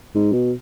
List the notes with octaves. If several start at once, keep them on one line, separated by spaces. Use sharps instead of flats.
G#2
B2